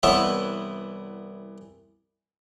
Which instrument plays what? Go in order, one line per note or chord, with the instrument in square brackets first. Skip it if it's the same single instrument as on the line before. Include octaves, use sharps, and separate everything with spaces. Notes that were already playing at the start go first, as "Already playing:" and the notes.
[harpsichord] C2 E3 B3 C#5 E5 F#5